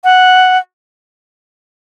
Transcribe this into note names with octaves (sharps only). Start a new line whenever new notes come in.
F#5